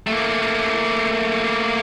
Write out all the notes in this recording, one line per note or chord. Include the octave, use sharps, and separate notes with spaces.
A3 A#3